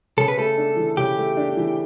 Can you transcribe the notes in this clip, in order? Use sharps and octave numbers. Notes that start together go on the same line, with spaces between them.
C#3 A4
B4
A3 A4
D4
E3
C#3 G4
A3
D4
E3